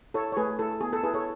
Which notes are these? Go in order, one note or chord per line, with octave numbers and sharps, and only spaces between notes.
E4 A4 C#5
C#5
A3 G#4 B4
E4 A4
B3 G#4
A4
E4 G#4 B4
A4 C#5